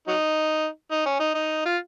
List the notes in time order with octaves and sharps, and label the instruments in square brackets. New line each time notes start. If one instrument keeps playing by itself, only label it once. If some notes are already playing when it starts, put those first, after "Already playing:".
[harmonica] F#3 D#4
D#4
C#4
D#4
D#4
F4